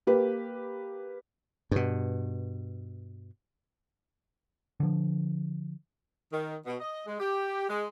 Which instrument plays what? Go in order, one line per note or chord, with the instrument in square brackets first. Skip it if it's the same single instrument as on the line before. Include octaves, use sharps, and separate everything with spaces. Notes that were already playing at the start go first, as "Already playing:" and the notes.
[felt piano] A#3 G4 B4
[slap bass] G2 B2
[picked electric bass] D3 F3
[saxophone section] D#3
B2
D#5
G#3
G4
G#3